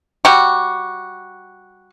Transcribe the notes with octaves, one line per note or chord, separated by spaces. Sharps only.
G3 F#4